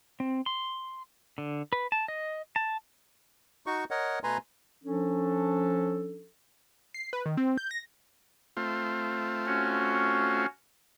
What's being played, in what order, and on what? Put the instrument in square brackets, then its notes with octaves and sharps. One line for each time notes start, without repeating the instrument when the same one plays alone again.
[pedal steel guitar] C4
C6
D3
B4
A5
D#5
A5
[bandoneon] D#4 F#4 C#6
A#4 C#5 D#5 F#5
B2 A3 B4 G#5 A#5 C6
[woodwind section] F3 C#4 D4 A4
[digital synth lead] C7
B4
D#3
C4
G6
A#6
[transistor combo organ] A3 C4 F4
[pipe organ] C#4 F#4